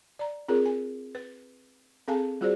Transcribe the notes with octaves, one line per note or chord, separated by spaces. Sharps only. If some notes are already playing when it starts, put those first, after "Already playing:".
D5 A#5
C4 F4 G#4 A#4 C#5
G#5
B4
C4 G#4 A4 F5 G#5 A5
G3 F4 F#4 G#4 C5 D5